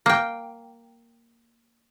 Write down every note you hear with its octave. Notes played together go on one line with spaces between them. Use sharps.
A#3 G5